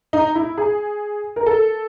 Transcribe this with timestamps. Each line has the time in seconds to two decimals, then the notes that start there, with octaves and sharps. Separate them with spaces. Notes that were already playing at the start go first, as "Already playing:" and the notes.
0.13 D#4
0.35 E4
0.58 G#4
1.36 A#4
1.46 A4